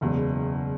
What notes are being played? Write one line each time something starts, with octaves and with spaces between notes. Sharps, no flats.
F#1 E2 B2 G#3